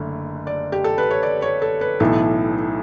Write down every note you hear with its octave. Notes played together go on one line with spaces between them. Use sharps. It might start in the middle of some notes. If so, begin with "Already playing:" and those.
Already playing: F#1 D3 A3
D5
G4
A4
B4
C#5
D5
C#5
A4
B4
B1 A2 E3 A4